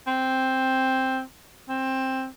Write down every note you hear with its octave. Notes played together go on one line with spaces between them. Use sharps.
C4
C4